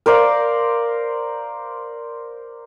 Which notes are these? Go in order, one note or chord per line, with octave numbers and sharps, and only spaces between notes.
A#4 C5 D5 F5